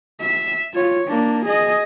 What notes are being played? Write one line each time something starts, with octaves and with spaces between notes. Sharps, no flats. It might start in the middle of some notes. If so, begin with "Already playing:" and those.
E5
F4 C#5
A#3 D4
G#4 D#5